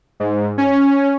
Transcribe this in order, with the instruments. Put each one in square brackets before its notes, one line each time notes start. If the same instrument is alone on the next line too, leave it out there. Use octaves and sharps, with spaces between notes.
[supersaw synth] G#2
C#4